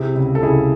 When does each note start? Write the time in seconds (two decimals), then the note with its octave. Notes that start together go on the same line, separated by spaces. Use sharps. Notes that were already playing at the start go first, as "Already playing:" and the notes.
Already playing: C3 E4 G#4
0.15 C#2
0.35 A4
0.42 C#2 E4 G#4